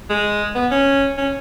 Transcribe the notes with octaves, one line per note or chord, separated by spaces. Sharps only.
G#3
B3
C#4
C#4